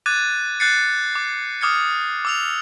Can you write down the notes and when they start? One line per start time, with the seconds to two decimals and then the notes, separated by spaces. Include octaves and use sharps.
0.06 D6 F#6 G#6 A6 D#7
0.60 F#6 G6 A6 C7 C#7
1.15 D6
1.61 D6 D#6 F6 G#6 C#7
2.25 D6 E6 F7